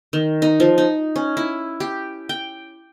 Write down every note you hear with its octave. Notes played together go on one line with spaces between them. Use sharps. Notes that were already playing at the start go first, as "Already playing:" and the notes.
D#3
D#4
F3
D#4
C#4
E4
G4
G5